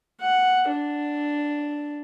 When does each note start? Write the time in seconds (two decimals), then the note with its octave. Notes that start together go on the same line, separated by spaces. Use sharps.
0.20 F#5
0.69 D4